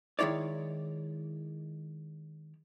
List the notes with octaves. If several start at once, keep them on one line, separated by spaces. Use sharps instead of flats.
D#3 G#3 E4 C#5 D5